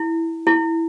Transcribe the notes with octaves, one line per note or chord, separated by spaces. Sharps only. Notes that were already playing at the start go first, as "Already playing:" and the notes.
Already playing: E4
E4